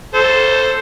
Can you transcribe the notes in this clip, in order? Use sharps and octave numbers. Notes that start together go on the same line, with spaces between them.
A4 C5